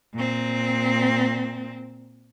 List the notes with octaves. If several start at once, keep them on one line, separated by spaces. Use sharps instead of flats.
A#2 C4